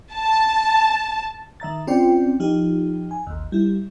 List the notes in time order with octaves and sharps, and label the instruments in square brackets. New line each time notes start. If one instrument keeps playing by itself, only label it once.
[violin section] A5
[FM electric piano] D#3 E5 A#5 A6
C4 C#4 F4 C5 D5 G5
F3 D#4 G4
G#5
A1 D#2
G3 E4